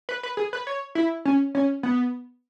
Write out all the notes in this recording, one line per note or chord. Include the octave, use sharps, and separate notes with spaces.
B4
B4
G#4
B4
C#5
E4
C#4
C#4
B3